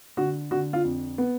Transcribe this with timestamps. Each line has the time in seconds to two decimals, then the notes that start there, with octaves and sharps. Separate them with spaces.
0.17 D3 F#4
0.51 D3 F#4
0.73 F4
0.85 F2
1.18 B3